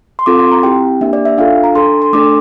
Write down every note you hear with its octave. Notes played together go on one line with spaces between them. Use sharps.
C6
C4 F4 A4 D6
C6
A#5
C4 E4 G4 G5
A#3 D4 G4 E5
D5
E5
D4 F4 A4 F5
A#5
D4 A4 C6
C6
A3 D4 A4 D6